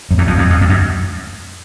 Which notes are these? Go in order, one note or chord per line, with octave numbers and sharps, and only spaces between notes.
F#2
E2
F2
F2
F2
F2
F#2